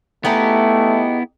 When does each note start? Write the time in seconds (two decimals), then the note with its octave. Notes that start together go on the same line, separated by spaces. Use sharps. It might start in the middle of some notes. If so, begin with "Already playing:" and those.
0.25 A3 B3 D#4 E4 G4 G#4